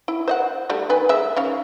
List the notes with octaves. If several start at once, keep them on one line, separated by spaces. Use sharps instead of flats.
E4
C5 D#5 F#5
G3 A3 D4
D#3 B4 G#5
G#3 E5
D#3 C#4 F5